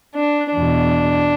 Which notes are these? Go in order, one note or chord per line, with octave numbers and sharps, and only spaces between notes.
D4
E2 B2 D4